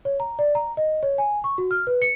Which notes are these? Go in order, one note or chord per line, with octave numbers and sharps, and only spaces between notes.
C#5
A#5
D5
A#5
D#5
C#5
G#5
C#6
F#4
F6
B4
C#7